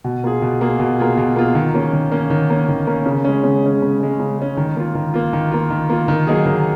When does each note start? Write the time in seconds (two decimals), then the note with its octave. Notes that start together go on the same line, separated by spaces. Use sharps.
0.04 B2
0.24 A#3 F4 G#4
0.42 B2
0.61 A#3 F4 G#4
0.80 B2
0.99 A#3 F4 G#4
1.17 B2
1.36 A#3 F4 G#4
1.55 D#3
1.74 A#3 C#4
1.93 D#3
2.12 A#3 C#4
2.30 D#3
2.50 A#3 C#4
2.69 D#3
2.87 A#3 C#4
3.06 C#3
3.25 G#3 C#4
3.44 C#3
3.63 G#3 C#4
3.82 C#3
4.00 G#3 C#4
4.19 C#3
4.38 G#3 C#4
4.57 D#3
4.76 A#3 F4
4.95 D#3
5.14 A#3 F4
5.33 D#3
5.52 A#3 F4
5.70 D#3
5.89 A#3 F4
6.08 D#3
6.27 F#3 A#3 D#4 G#4
6.46 D#3